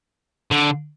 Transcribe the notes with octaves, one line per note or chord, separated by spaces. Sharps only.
D3